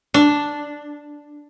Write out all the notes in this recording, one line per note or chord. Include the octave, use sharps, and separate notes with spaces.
D4